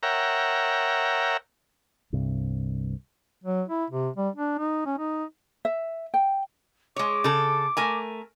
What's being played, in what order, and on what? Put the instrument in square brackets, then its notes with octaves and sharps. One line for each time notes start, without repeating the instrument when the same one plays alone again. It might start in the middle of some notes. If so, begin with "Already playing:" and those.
[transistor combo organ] A#4 C#5 E5 F#5 G5 A#5
[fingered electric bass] C2 G2 C3
[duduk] F#3
E4
C3
G3
D4
D#4
C#4
D#4
[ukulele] E5
G5
[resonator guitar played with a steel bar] G#3 C#5 [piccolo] D6
[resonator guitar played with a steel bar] C#3 A4
A3 A#4 G#5